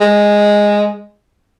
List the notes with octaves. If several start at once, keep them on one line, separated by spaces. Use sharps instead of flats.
G#3